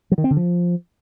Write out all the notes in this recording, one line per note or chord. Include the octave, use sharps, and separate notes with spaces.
F#3
D#3
C4
D3
F3